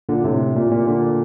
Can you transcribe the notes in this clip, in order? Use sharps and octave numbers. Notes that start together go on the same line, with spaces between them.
A#2 D3
A2 C3
A#2
A#2
A#2 D3